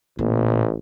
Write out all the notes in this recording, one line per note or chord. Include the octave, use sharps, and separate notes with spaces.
A1 A#2